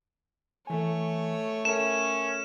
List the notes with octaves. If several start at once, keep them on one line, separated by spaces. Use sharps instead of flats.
E3 A3 C#5 G#5
C#4 A4 A#4 E5 E7